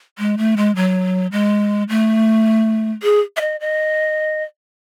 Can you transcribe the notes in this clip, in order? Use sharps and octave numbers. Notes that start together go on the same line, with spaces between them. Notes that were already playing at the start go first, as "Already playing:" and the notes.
G#3
A3
G#3
F#3
G#3
A3
G#4
E5
D#5
D#5